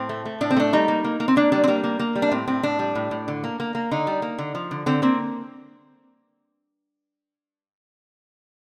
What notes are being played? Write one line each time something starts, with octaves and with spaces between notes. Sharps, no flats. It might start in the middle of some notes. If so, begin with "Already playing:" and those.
Already playing: A2 C4
A3
A3
A2 D4
C4
A3 D4
G3 D#4
A#3
A#3
A#3
C4
A#3 D4
G3 D4
C4
G3 A#3
A#3
A#3
G3
D4
A2 C4
A2 C4
A2 D4
G3
A2
A2
D3
A#3
A#3
A#3
D3 D#4
G3
A#3
D3
F3
D3
D3 C4
A#3 C4